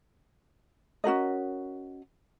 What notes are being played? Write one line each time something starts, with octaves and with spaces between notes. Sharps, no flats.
C#4 F#4 A#4 D#5